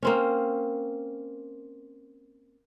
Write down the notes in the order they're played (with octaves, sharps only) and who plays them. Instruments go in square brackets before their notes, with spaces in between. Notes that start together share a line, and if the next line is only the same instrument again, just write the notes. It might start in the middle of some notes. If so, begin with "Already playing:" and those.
[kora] A#3 C4 C#4